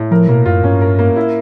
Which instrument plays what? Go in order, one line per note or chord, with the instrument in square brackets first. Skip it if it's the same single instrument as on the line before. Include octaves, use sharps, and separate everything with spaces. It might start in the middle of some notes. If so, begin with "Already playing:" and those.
Already playing: [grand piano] A2
[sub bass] F3 [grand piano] A#4
[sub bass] B2 [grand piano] A#3
[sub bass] F#2 [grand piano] F4
[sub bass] G2 [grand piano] C#4
[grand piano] A#4
A#3
E4